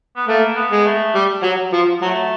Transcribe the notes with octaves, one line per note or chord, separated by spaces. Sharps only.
B3
A3 A#3
B3
G#3
A3
G3
F#3
F3
F#3 A3